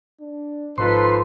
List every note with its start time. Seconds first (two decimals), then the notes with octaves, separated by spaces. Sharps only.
0.21 D4
0.78 G#1 F3 D#4 A4 B4 C6